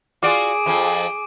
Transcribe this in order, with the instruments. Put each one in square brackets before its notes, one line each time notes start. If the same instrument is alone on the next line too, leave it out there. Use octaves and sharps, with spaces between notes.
[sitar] F4 F#4 D5 [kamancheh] G#4 [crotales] D6 D7
[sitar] F2 F3